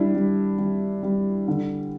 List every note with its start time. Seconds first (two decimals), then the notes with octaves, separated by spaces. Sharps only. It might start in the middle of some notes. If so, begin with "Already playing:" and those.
Already playing: G3 D4 E4
0.15 G3
0.58 G3
1.03 G3
1.48 D3